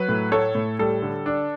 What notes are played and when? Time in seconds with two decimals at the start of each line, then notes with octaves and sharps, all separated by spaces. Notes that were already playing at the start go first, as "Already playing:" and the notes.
Already playing: F#3 B4
0.09 A2
0.32 A3 A4 C#5
0.55 A2
0.79 G3 A4
1.02 D3
1.26 D4